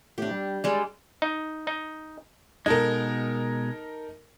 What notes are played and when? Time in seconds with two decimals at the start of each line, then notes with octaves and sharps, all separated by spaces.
0.18 A2 D4 G4
0.31 G3
0.64 G3 G#3 D5
1.22 D#4
1.67 D#4
2.66 B2 G#3 D#4 A4 A#4